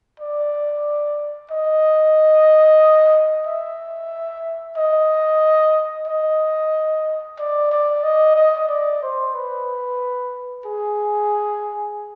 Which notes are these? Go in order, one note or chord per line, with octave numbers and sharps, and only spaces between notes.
D5
D#5
E5
D#5
D#5
D5
D5
D#5
D#5
D5
C5
B4
G#4